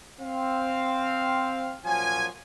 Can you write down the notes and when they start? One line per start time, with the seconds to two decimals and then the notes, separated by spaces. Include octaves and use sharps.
0.21 C4 F5
1.85 A#2 F3 F#3 C#4 G#5